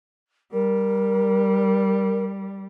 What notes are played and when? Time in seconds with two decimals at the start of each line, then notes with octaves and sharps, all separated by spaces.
0.53 G3 A#4